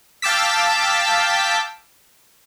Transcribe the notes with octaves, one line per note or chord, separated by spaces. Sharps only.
F5 G5 A5 D6 E6 B6